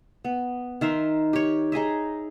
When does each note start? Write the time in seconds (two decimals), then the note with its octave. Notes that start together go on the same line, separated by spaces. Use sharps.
0.25 B3
0.81 D#3 E5 A#5 C6
1.33 G4 C#5
1.72 D#4 G#4 D#5 E5